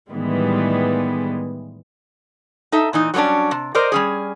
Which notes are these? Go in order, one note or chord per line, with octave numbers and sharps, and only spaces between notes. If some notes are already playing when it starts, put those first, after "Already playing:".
A2 D#3 E3 G3 G#3 B3
D#4 A4 E5
A#2 E3 D#4
F#3 G3 A#3 C#4 D4
C3
A#4 C5 D5 D#5
G3 C#4 G#4